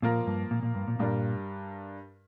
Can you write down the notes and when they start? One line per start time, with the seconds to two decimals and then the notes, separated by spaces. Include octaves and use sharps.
0.02 A#2 F3 A#3 F4 A#4
0.27 G2
0.51 A#2
0.63 A#2
0.75 G2
0.88 A#2
0.99 G2 A#2 G3 D4 A#4